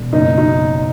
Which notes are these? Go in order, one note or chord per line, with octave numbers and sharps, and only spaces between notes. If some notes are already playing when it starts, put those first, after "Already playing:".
Already playing: E1
F#1 D#4
D#4